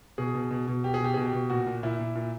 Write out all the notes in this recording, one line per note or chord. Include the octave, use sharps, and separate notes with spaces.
B2 G#4
B2
B2
B2
B2 G4
G#4
B2 G4
B2 G#4
G4
B2
A#2 F#4
A#2
A#2 E4
A#2
A#2